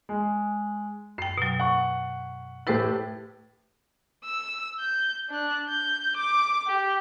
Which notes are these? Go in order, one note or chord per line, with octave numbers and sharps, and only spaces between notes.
G#3
F#2 G5 C7
B2 F#3
F#5 C#6
A2 E4 G4 B4 C5 A6
E6
G6
D4 F#6
G6
D6
G4